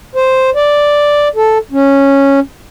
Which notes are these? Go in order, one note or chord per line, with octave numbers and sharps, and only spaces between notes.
C5
D5
A4
C#4